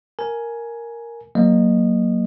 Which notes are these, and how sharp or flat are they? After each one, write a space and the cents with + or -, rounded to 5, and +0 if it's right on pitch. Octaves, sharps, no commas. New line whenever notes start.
A#4 +0 G#5 +10
F#3 +0 A#3 +0 D#5 -20